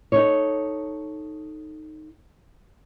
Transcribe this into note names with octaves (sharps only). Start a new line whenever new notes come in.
D#4 A4 C#5